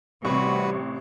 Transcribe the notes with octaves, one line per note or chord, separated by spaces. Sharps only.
A1 C3 G3 F#4 B4 F#5 C#6